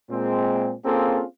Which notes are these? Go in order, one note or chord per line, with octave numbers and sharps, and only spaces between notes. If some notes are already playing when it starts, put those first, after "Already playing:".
A#2 G#3 C4
A#3 C4 C#4 F4 G#4 A4